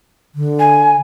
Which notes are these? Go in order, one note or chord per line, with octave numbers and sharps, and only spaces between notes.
D3
G#5